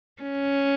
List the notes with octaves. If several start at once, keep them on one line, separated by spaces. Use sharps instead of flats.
C#4